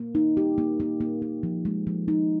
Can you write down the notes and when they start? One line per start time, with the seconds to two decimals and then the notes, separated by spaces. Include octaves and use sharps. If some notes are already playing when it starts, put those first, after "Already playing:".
Already playing: A#3
0.15 D#4
0.37 G4
0.58 A#3
0.80 A#3
1.01 A#3
1.22 A#3
1.43 F3
1.65 G#3
1.87 F3
2.08 D#4